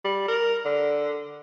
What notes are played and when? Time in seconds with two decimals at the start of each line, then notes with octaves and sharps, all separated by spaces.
0.05 G3
0.28 A#4
0.65 D3